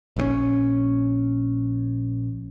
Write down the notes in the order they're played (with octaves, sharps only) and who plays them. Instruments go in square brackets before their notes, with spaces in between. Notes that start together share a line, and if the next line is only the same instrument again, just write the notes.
[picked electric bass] A#1 C#3 C#4